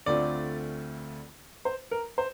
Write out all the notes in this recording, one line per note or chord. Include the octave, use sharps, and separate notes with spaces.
D2 D3 A3 C4 F4 D5
C5
A#4
C5